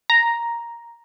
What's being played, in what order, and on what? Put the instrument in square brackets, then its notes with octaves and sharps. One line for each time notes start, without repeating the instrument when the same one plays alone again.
[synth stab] A#5